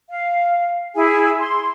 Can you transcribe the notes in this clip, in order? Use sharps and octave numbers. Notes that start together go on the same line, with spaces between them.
F5
E4 G#4 G#5
C6